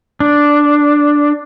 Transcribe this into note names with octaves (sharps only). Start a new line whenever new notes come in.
D4